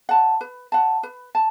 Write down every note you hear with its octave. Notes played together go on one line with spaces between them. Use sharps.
F#5 A5
B4
F#5 A5
B4
A5